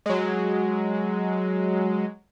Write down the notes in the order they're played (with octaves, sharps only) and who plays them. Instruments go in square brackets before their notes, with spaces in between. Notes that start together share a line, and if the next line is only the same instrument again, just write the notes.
[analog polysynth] F#3 G#3